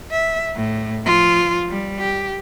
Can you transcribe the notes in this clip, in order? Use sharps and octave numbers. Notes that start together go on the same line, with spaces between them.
E5
A2
F3 F4
G3
G4